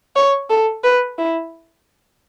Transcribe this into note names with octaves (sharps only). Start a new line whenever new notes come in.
C#5
A4
B4
E4